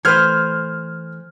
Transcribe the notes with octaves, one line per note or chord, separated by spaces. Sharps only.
E3 A3 B4 C5 F6 G#6